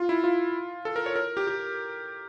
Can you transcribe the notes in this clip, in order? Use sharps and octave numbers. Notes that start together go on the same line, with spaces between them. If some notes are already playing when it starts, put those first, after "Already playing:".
Already playing: F4
E4
F4
A4
A#4
C#5
A#4
G4
G4